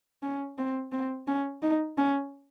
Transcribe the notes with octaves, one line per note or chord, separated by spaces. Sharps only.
C#4
C4
C4
C#4
D#4
C#4